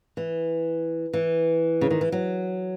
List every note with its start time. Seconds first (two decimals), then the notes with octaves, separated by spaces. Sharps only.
0.17 E3
1.14 E3
1.81 C#3
1.91 D#3
2.01 E3
2.12 F#3